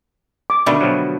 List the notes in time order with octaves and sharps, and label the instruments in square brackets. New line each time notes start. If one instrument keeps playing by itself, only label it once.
[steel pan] D6
[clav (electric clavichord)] B2 D#3 [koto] D3 G3 A3
[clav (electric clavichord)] B2 F3 F#3